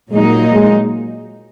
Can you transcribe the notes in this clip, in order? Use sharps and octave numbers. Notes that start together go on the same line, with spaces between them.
A#2 F#3 G#3 A#3 D#4
G#3